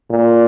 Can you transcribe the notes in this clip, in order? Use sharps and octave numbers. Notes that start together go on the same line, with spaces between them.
A#2